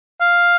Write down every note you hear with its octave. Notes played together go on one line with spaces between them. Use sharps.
F5